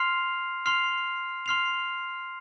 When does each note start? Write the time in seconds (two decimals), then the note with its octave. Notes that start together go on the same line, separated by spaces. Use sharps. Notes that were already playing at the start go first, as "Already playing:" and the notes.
Already playing: C6 F6 C7 F7
0.66 C6 F6 C7 F7
1.46 C6 F6 C7 F7